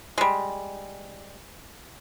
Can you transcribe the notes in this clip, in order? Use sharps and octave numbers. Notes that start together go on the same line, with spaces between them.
G3 G#3